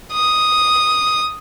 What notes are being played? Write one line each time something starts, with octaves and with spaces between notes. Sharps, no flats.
D#6